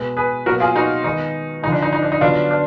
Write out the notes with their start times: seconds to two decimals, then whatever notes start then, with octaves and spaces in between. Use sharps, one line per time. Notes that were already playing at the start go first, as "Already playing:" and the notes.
Already playing: B2 G#3 B3
0.17 G#4 B4
0.46 B2 F#3 A#3 F#4 A#4
0.60 F4 G#4
0.75 D#4 F#4
1.04 D#3 G#3 B3 D#4
1.63 D3 F3 G#3 D#4
1.72 D4
1.82 D#4
1.93 D#4
2.03 D4
2.12 D#4
2.21 D3 F#3 B3 D4 F4
2.51 D4